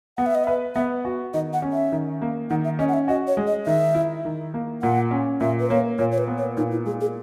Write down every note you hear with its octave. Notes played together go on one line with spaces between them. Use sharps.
B3 F#5
E5
D#5
B4 E5
B3 E5
F#4
D#3 D#5
F#5
C#4
E5
D#3
A#3
D#3 F#5
E5
C#4 D#5
F#5
E5
F#4 D#5
C#5
G#3
D#5
D#3 E5
E4
D#3
A#3
A#2 F#5
C#4
A#2 E5
B4
A#3 C#5
A#2 C#5
C#5
B4
B3
C#5
A#2 D#4
E4
G#3 G#4
G#4